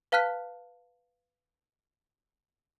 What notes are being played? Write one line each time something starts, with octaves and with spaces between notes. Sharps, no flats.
B4 F5 A5 F6 F#6 B6